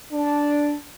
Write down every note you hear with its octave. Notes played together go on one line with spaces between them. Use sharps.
D4